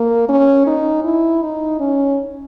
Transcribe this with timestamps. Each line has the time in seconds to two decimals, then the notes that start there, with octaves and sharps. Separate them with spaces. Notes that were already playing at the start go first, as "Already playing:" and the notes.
Already playing: A#3
0.29 C#4
0.67 D#4
1.04 E4
1.42 D#4
1.80 C#4